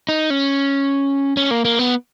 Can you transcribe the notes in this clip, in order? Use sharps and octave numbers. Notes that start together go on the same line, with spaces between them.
D#4
C#4
C#4
A#3
A#3
B3